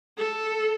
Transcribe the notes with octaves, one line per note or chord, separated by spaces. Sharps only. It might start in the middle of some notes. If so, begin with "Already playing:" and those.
A4